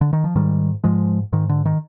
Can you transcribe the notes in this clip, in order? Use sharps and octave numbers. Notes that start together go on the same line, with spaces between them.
D3
D#3
F3
G#2 D#3 G3
G#2 F3 G#3
G#2 D#3
D3
D#3